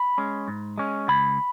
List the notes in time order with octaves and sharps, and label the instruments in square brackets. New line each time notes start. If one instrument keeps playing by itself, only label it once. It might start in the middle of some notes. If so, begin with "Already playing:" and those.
Already playing: [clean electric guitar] B5
G#3 C#4
G#2
G#3 C#4
C#2 B5